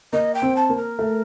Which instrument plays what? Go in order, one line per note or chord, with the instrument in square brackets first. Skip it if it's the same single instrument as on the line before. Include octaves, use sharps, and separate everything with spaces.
[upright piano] A#3 [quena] D#5
[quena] G5
[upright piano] C4
[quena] A5
[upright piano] A#3
[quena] A#4
[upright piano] A3